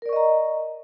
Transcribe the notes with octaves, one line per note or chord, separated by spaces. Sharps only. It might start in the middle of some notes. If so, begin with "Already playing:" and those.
A#4 D5 D#5 A#5 C#6